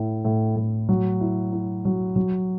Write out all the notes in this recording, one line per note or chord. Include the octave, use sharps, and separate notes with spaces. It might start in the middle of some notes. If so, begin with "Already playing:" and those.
Already playing: A2 E4
A2
A2
F#3
E4
E4
F#3
F#3